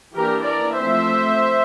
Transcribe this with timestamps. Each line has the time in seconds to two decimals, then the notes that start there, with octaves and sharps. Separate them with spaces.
0.14 E3 A#3 D4 G4 A#4
0.46 A#4 D5
0.77 F3 A3 C4 C5 E5